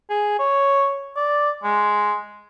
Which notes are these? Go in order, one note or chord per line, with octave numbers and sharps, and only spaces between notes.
G#4
C#5
D5
G#3